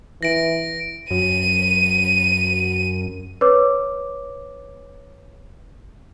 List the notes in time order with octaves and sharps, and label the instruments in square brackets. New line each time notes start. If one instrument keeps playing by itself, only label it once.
[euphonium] E3 [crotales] A#6 D7
[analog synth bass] F#2 [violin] D#7
[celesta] B4 C#5 D6